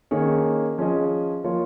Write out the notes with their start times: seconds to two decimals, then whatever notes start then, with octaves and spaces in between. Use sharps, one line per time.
0.11 D#3 A#3 C#4 G#4 C#5
0.78 F3 C#4 G#4 D#5
1.44 F3 A#3 F4 C#5